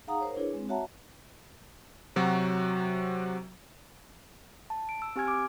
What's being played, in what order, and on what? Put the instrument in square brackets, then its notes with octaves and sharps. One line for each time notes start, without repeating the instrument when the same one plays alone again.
[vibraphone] D#4 G#4 F5 F#5 A#5 D#6
A#4 C5 C#5
D4 E4 G#4 B4 C#5
G#3 C4
F#4 C#5 E5 F#5 A5 A#5
[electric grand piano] C3 F#3 F#4
[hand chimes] A5
D7
E6
C4 G4 G#5 F6 G#6
D6 D7